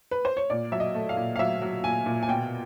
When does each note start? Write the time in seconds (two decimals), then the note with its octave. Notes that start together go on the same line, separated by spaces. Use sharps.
0.11 B4
0.25 C5
0.37 C#5
0.50 A#2 D5
0.72 F#3 E5
0.80 D#5
0.95 A3
1.09 F5
1.17 A#2
1.36 F5
1.39 F#3 E5
1.62 F#3
1.84 A#2 G#5
2.06 A#2
2.23 G#5
2.29 B2 G5